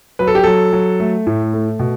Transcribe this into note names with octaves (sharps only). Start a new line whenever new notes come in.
F#3 B4
A4
G4
F#3 A4
F#3
A3
A2
A3
B2